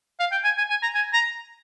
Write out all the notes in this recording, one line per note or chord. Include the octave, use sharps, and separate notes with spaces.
F5
G5
G#5
G#5
G#5
A#5
G#5
A#5